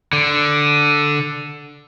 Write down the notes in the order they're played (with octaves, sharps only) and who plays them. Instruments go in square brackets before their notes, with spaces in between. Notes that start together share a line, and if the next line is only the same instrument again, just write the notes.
[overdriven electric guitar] D3